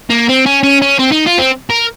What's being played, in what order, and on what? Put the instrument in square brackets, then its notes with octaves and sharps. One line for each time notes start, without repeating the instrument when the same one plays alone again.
[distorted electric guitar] A#3
C4
C#4
C#4
C#4
C4
D#4
F4
C4
A#4